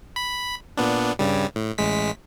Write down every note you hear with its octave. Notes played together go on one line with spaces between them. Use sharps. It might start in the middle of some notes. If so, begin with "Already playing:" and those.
B5
A#2 B3 D4
G2 C#3 G3
A2
A1 G#3 B6